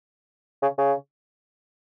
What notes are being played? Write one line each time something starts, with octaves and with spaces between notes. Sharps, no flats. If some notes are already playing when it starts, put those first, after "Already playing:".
C#3
C#3